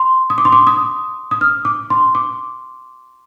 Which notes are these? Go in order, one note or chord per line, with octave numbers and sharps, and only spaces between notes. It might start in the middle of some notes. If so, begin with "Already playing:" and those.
Already playing: C6
D#6
D6
C6
D6
D#6
D#6
F6
D6
C6
D6